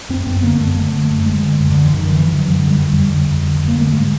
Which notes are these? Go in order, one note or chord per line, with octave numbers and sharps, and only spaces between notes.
F#2 C4
F#2 B3
D3 A#3
F#2 A3
D3
D3
F#2
F#2 G#3
D3
F#2
F#2 D3
E3
F#2 D#3
D3 F3
E3
D3
F#2 F#3
D3 G3
F2
F2 G3
D3
F2
D3
D3
A#3
D3 A3
G#2 G#3